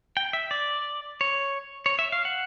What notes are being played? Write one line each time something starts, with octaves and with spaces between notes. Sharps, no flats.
G5
E5
D5
C#5
C#5
E5
F5
F#5